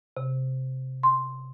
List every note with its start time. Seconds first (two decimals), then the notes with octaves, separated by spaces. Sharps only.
0.17 C3
1.03 C6